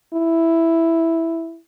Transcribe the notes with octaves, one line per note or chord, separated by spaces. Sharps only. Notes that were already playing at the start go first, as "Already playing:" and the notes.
E4